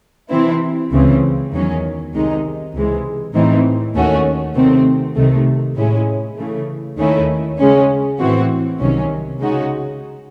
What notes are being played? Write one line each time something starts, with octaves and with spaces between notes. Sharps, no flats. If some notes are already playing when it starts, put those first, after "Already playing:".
C3 E3 C4 E4
C#2 C#3 E3 C4
E2 D#3 F#3 C#4
C2 C3 D#3 G#3 D#4
C#2 C3 E3 G#3
A2 E3 C4 D#4
D#2 D#3 A3 C#4 F#4
C3 D#3 A3 C4
C2 C3 D#3 A3
A2 G#3 C#4 E4
C#3 E3 A3
D#2 D#3 A3 C#4 E4
C#3 G#3 C#4
A2 E3 C4 F#4
C2 C3 D#3 F#3 C#4
C#3 G#3 D#4 F#4